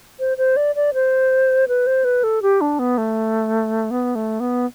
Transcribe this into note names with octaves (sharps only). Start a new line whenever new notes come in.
C5
C5
D5
D5
C5
B4
C5
B4
A4
G4
D4
B3
A3
B3
A3
B3